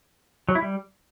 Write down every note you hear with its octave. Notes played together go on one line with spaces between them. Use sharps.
F#3
E4
G3